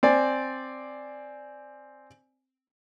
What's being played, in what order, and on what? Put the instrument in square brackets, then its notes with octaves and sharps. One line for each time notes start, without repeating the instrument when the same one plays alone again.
[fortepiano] C4 D5 G#5